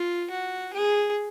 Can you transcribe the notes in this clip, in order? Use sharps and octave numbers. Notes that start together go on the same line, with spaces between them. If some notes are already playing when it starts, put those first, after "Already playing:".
Already playing: F4
F#4
G#4